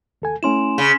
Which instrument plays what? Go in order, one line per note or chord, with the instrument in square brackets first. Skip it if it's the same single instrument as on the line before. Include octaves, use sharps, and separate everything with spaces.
[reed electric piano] D#2 A4 G#5
[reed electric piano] A3 C#4 E4 [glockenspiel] G#5 C6 E7
[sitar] C#3